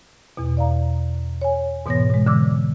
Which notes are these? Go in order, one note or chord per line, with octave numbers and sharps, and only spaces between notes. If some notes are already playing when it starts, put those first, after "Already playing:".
E2 B2
D5 F5 A#5
C#5 G#5
G#2 B2 E3 B3 C#5 A#6
B2 G#3
D3 E3 D6 E6